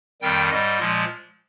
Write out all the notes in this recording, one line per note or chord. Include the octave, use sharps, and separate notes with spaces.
F2 D#3 G3 G5
G#2 G3 D#5
A#2 F3 G#3